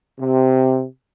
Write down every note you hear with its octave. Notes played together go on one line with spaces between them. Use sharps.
C3